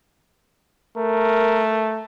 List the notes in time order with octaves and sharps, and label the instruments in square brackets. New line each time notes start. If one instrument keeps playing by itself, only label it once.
[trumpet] A3 [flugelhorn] A#4